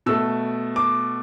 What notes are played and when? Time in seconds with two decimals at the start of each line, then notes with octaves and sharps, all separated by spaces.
0.06 B2 A3 E6
0.76 D6